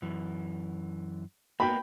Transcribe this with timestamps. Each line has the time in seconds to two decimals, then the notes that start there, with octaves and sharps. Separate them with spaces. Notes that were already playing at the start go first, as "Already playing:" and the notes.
0.02 F#2 E3
1.60 A#3 B3 G5 B5